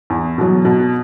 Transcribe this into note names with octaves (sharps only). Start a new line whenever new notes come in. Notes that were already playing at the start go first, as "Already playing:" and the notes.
E2
B2 F#3
B2